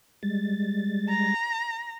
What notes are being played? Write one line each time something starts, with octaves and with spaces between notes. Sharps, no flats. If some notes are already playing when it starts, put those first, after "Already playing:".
G3 G#3 A6
A#5